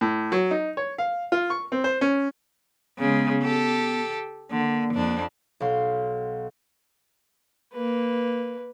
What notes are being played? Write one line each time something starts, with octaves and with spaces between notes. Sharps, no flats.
A2
F#3
D#4
C#5
F5
F4
C#6
C4
C5
C#4
C#3 G#3 B3
G4 A4
D3 A#3
F2 D4
B1 F5 C6
A#3 B4